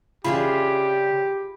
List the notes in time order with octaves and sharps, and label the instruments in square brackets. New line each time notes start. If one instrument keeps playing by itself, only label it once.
[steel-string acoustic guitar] C#3 C#4 D4 [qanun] F4 G#4 E5 [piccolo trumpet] G4 [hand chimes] B5